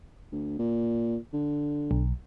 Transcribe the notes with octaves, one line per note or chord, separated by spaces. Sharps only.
D2
A#2
D3
B1